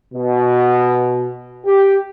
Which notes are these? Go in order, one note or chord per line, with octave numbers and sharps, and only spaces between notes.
B2
G4